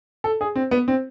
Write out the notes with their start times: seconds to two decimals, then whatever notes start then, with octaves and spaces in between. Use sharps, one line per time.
0.24 A4
0.41 G#4
0.56 C4
0.71 B3
0.88 C4